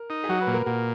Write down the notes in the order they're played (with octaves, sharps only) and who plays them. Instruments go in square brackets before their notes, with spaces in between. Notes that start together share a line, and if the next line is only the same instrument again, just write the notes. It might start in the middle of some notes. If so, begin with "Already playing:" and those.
Already playing: [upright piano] A#4
[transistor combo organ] D#4
[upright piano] G#4
[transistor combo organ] F#3 [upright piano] F#4
[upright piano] B4
[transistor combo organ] A#2
[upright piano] A#4
[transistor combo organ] A#2 [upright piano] F#4